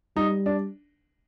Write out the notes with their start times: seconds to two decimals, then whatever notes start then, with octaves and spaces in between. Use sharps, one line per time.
0.16 G3 D#4
0.46 D4